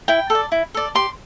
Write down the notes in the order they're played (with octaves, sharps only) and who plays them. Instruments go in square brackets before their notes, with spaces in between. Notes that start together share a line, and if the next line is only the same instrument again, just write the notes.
[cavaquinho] E4 G5
A4
D5
E4
A4 D5
G4 C6